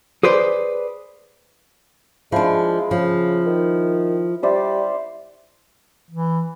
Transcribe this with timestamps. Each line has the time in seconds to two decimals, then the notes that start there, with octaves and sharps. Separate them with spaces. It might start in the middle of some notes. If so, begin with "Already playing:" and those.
0.23 G#4 B4 C5 D5
2.32 F3 G#3 D4 E4
2.91 C#3 F3
3.46 D#3
4.43 G3 C5 D5 E5
6.11 E3